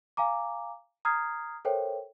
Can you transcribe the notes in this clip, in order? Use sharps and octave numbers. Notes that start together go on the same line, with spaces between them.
F5 G#5 A#5 D6
A#5 D#6 F6 G#6 C7
A4 A#4 C5 C#5 E5 G5